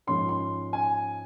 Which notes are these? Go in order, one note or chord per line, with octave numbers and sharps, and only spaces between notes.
G#2 F3 A#3 C#4 C6
C6
G#5